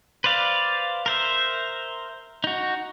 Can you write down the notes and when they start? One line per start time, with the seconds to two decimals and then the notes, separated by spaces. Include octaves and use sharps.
0.24 B4 C5 D5 F5
1.06 A#4 C5 E5
2.44 D#4 F#4